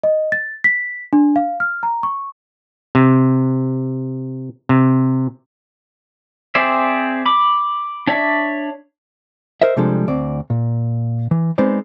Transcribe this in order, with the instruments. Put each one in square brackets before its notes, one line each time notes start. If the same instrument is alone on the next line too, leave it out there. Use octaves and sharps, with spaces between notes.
[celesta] D#5
A6
B6
D4
F5
F6
A#5
C#6
[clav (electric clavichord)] C3
C3
[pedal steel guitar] C4 G#4 C5 D5 E5
B5 D6
D4 C#5 D5 E5
[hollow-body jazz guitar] A#4 C5 D#5 E5
C3 F3 G3 G#3 D4 A4
D2 C4 D5
A#2
E3
G#3 B3 C4 D#4 C5 D5